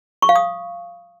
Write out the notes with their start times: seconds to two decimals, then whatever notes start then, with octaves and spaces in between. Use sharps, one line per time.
0.22 C#6
0.29 F5
0.36 D#6